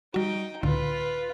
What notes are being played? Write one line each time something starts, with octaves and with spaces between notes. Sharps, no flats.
G3 D#4 F#4 G5
C#2 A2 D3 F4 B4